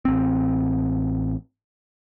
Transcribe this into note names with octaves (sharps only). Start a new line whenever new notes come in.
A1 C4